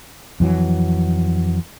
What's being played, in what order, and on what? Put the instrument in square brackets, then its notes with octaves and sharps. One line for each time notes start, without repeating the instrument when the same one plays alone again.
[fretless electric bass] F2 E3 F#3